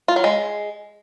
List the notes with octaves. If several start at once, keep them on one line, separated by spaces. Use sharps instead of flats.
F4
F#3
G#3